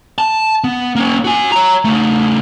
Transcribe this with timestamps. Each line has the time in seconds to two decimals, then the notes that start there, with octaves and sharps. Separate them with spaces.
0.18 A5
0.64 B3
0.96 A#3 C#4
1.25 F#4 G#5
1.52 C#5 A#5
1.85 C#3 A3